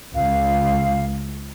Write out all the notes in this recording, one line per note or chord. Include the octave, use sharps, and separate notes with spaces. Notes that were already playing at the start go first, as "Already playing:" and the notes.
C#2 F5